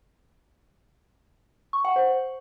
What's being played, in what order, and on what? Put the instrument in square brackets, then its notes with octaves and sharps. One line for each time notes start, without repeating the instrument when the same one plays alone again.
[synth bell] C#6
F#5
C5